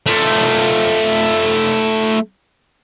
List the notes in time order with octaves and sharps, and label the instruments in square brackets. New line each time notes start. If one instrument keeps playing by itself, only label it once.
[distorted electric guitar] A3 F4